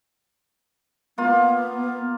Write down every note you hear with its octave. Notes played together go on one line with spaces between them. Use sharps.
A#3 B3 F4